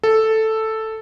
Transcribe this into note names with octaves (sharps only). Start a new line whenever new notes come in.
A4